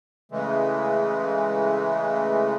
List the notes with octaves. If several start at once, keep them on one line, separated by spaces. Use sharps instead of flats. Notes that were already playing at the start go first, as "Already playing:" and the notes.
C#3 E3 G#3 A3